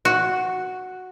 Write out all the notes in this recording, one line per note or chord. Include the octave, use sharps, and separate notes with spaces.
F#4